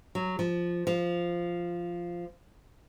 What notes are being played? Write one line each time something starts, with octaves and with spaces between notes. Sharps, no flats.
F#3
F3
F3